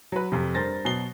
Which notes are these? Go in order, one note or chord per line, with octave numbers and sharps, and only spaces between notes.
F#3 B4
F2 C3
G2 A#4 C5 A6 A#6
B2 F#3 C7 G7